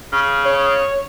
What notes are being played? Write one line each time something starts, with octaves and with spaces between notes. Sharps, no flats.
C#3
C#5